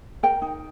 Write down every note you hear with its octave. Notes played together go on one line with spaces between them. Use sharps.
A#4 G5
D#4